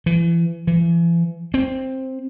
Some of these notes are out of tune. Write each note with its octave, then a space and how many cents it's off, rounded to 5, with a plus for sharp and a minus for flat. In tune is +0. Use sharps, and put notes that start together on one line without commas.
E3 +35
E3 +40
C4 +5